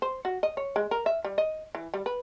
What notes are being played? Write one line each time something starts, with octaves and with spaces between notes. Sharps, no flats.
C5
F#4
D#5
C#5
G#3
A#4
E5
G3
D#5
E3
G3
B4